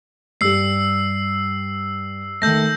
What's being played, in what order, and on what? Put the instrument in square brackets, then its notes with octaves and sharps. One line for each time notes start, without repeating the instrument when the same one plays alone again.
[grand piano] G2 G3 [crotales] E6 C7
[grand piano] D#3 A3 [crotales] E6 G6 A#6